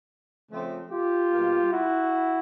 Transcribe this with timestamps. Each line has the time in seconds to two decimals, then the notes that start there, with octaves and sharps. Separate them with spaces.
0.51 C#3 F3 A3 C4
0.92 F4 G4
1.32 B2 G3 A#3
1.73 E4 F#4